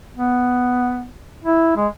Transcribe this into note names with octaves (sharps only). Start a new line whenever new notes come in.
B3
E4
G#3